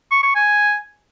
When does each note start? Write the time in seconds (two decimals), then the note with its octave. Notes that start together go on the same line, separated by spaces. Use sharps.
0.11 C#6
0.23 C#6
0.35 G#5